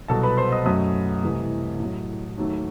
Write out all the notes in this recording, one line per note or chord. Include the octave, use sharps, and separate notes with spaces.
C2 B2 F#3 A4 A5
B4 B5
C5 C6
D#5 D#6
F#2 F#3 A3 D#5 D#6
C2 C3 E3 A3
A2 F#3 A3
D#2 D#3 F#3 A3